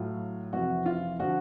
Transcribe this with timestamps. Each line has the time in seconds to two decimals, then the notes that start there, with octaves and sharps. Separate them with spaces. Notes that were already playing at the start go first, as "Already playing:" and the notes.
Already playing: A2 F#3 F4
0.53 F2 C3 E3 F#4
0.86 F4
1.20 D3 F3 F#4